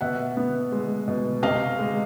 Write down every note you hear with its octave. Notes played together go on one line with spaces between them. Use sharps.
B2 E5 F#5
B3
G#3
B2
C3 D#5 F5
G#3